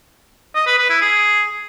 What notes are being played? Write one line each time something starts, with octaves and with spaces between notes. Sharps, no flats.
D#5
B4
B4
E4
G#4